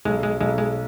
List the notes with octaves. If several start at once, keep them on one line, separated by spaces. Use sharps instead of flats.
B1 G#3
G#3
B1 G#3
G#3